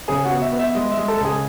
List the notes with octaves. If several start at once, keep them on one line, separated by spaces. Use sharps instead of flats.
C#3 G#4 G#5
F#4 F#5
B3
E5
B3
E5
G#3 D#5
E5
G#3
A4 A5
C#2 G#4 G#5